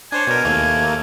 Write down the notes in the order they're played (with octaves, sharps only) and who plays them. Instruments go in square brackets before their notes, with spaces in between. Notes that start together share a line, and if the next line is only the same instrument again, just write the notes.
[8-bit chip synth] D4 C5 C#5 [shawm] G#5
[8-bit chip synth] B2 A#4
D#2 A3 A#3